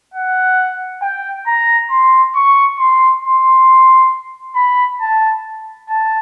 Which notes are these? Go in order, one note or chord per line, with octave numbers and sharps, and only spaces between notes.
F#5
G5
A#5
C6
C#6
C6
C6
B5
A5
A5